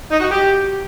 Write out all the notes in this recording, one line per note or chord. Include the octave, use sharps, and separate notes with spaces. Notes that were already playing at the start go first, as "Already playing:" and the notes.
D#4
F#4
G4